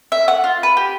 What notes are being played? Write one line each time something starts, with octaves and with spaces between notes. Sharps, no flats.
E5
F#5
F4
B4
G4